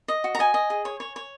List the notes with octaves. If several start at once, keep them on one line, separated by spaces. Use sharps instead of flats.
D#5
F#4
A#5
D#5 G#5
D#5
G#4
C#5
C#5
C#5